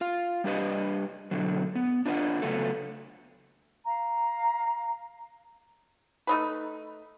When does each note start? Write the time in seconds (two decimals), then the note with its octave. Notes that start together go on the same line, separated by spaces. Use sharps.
0.01 F4 F5
0.44 G3 D4 G4 B4 D#5
1.31 B2 D3 F#3
1.75 B3
2.06 D4 F4 B4 D#5 F#5
2.42 C#3 F#3 A3 B3 F4 A4
3.85 F5 A#5
6.27 A3 D#4 B4